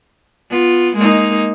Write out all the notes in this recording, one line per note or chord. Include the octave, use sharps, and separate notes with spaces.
B3 F4
G#3 A#3 D#4